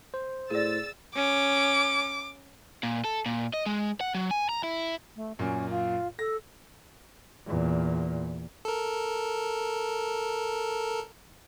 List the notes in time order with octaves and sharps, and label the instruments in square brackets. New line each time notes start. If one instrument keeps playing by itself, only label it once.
[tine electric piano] C5
[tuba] A2 [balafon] G#4 D5 [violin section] E6 A6
[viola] C#4 [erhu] D6
[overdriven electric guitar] A#2
A4
A#2
D#5
G#3
F#5
F#3
G#5
A#5
E4
[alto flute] A3
[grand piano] F#2 A#2 [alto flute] C#4
[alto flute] F4
[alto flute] A4 [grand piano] A#6
[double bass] E2 A#2
[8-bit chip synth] A4 A#4